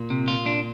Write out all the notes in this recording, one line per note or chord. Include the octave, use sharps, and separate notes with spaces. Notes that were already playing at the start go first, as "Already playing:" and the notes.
Already playing: A#2
C3
F4
D4